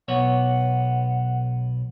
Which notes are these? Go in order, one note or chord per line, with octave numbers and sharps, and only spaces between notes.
B1 B3 C#5 F#5